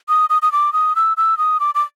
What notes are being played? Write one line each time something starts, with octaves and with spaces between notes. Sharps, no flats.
D#6
D#6
D#6
D6
D#6
E6
E6
D#6
D6
D6